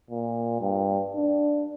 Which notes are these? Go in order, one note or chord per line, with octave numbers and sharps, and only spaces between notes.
A#2
G2
D4